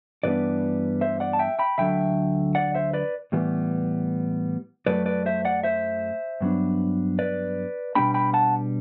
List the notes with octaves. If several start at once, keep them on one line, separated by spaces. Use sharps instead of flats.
G2 E3 G3 B3 D4 B4 D5
C5 E5
D5 F#5
A5
E5 G5
G5 B5
D2 D3 F#3 E5 G5
D5 F#5
C5 E5
B4 D5
A2 E3 G3 B3
F#2 F#3 A3 B4 D5
B4 D5
C5 E5
D5 F#5
C5 E5
G2 F#3 B3 D4
B4 D5
B2 G3 B3 D4 G5 B5
G5 B5
F#5 A5